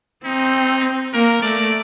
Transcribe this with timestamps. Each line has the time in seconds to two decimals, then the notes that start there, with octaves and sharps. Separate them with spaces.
0.25 C4 D#4
1.13 A#3 A#4
1.42 A3 D5